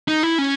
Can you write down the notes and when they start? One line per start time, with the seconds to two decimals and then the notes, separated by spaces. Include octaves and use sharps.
0.08 D#4
0.23 E4
0.38 C#4